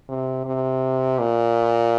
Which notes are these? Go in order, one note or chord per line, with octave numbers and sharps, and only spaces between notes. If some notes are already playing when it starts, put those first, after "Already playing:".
C3
C3
A#2